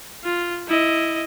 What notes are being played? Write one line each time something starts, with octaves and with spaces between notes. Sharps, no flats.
F4
E4 D#5